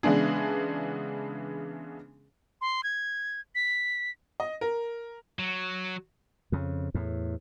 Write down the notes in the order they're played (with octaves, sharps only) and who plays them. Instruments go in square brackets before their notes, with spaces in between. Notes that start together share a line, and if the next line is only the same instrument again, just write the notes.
[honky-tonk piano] C#3 E3 G#3 B3 D4 G#4
[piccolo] C6
G#6
B6
[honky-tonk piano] D#5
A#4
[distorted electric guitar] F#3
[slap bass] F2 C#3
E2 A2